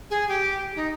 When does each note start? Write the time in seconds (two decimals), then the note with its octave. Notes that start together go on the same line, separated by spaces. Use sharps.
0.10 G#4
0.29 G4
0.76 D#4